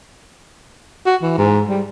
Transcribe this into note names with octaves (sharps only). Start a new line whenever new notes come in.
F#4
E3
G#2
G3